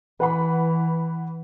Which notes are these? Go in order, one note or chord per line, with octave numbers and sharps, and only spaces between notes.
E3 B4 F#5 B5